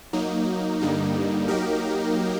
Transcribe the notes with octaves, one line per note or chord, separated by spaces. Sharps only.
F#3 A#3 D#4
G2 D3 G3 A#3 D#4
F#3 A#3 D#4 G4 A#4